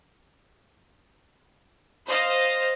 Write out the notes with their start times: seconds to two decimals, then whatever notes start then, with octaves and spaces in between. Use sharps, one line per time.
2.06 C5 D#5 F5